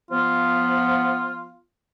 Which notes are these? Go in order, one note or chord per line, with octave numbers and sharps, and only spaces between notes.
F3 B3 F4